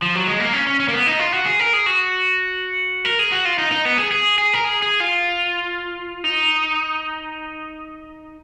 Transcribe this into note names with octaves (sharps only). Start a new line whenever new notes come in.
F3
F#3
G#3
A#3
C#4
C#4
C#4
A#3
B3
D#4
F4
F#4
G#4
A#4
G#4
F#4
A#4
G#4
F#4
F4
D#4
D#4
B3
G#4
G#4
G#4
A#4
G#4
G#4
F4
D#4